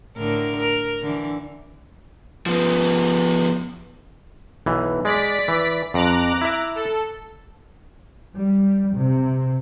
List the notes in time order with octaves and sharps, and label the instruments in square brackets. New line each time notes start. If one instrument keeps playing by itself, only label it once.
[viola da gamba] A2 D3 A#4
A#4
D3 E3
[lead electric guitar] F3 B3
[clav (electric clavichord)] B1 E3
[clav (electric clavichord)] G#3 [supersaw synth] D5 B6
[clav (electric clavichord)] E3
[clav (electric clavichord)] F2 [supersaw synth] A#5 D6 F#6
[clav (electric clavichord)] E4 E5
[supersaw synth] A4
[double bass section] G3
C3